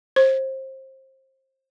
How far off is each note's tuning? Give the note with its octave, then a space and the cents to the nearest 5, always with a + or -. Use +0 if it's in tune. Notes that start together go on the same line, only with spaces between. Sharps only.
C5 +25